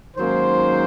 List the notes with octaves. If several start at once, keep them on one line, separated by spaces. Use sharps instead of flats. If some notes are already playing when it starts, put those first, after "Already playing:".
G#2 D#3 F#3 A#3 C#4 C5